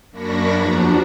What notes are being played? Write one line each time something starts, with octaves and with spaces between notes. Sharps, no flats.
F#2 A#3 D4 B5 C#6 A#6
E2 F3 D4 F#4 A#5